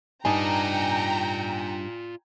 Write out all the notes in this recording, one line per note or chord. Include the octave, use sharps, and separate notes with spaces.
G2 D#4 F4 D5 G5 G#5 A#5